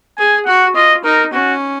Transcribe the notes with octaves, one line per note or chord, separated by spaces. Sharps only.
G#4 G#5
F#4 F#5
F4 D#5
D#4 A#4
C#4 F#4